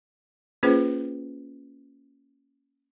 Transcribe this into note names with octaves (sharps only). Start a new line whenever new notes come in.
A#3 C#4 F4 G#4 B4 C5